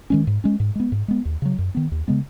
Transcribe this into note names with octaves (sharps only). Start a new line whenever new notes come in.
D#3 G#3 C#4
G#2
G#3 C#4
G#2
G#3 B3
G#2
G#3 B3
D#2
C#3 F#3
F#2
D#3 B3
D#2
C#3 G#3 B3